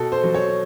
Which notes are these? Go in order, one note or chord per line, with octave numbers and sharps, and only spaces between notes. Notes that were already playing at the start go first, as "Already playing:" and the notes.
Already playing: B2 A4
C5
F#3
C#5